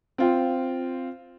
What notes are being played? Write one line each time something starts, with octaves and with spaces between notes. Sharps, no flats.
C4 F4 G5